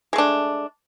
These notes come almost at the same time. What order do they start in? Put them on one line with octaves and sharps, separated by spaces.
G#3 A3 D4